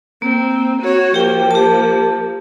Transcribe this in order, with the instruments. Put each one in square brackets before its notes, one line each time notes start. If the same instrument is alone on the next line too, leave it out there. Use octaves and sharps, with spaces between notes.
[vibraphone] A#3 [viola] C4
[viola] F#4 C#5
[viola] F3 A#3 [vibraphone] G4 G5
[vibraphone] G4 A5